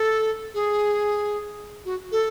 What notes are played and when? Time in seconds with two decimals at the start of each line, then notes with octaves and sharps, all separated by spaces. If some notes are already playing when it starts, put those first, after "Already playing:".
Already playing: A4
0.54 G#4
1.85 F#4
2.12 A4